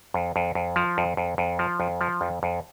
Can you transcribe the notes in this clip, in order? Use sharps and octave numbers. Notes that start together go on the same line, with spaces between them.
F2
F2
F2
F3
F2
F2
F2
F3
F2
F3
F2
F2